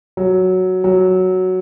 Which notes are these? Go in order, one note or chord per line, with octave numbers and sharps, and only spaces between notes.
F#3
F#3